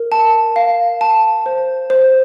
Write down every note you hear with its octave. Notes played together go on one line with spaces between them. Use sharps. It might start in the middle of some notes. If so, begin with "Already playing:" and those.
Already playing: A#4
A5
F5
A5
C5
C5